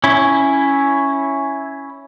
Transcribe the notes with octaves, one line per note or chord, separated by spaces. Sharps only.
C#4 E4